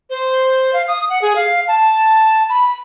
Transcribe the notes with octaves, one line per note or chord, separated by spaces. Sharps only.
C5
F5
D#6
F#5
G#4
F5
A5
B5